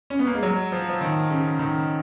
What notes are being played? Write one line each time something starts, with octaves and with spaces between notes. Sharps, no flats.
C#4
B3
A#3
G#3
F#3
F3
F3
D#3
C#3
D#3